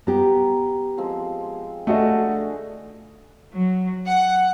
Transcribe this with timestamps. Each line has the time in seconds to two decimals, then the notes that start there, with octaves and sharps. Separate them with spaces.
0.07 B3 G4 A#5
0.98 F3 G#3 C4
1.87 D3 A3 F#4 G#4 D#5 C#6
3.54 F#3
4.07 F#5